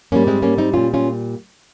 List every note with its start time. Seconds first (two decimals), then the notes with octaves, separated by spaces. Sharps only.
0.12 G#2 G3 A#3 C#4
0.27 G#3 C4
0.42 A#3 C#4
0.58 C4 D#4
0.73 A#2 G3 C#4 F4
0.94 C#4 F4